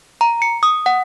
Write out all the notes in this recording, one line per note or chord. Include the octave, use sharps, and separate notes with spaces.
A#5
C#7
D#6
F#5